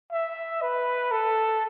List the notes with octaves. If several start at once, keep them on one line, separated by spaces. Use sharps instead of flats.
E5
B4
A4